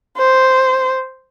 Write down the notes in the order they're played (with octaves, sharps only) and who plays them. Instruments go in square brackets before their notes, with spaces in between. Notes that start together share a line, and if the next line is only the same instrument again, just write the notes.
[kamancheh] C5